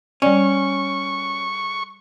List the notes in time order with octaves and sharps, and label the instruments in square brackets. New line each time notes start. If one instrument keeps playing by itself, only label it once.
[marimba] G3 D5 [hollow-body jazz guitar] C#4 [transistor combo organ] C#6